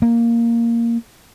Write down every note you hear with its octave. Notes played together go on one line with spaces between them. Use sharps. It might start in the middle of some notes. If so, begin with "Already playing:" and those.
A#3